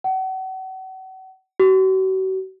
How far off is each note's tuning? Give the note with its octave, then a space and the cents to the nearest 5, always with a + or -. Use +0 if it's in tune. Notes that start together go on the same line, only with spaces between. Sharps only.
F#5 +35
F#4 +40